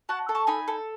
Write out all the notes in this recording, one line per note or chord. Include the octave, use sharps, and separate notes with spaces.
F#4 F#5 A5
A4
A5 C#6
D#4 G#5 B5
A4